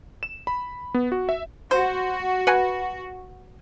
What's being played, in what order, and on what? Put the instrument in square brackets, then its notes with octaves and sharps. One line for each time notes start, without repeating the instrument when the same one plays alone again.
[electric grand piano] E7
B5
B3
F#4
E5
[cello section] F#4 [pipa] C5
[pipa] B4 F#5 G#5